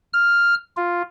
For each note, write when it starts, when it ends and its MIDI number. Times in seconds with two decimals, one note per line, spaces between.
0.13 0.55 89
0.77 1.02 65